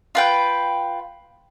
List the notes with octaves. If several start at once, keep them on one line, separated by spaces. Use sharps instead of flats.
F4 B4 G5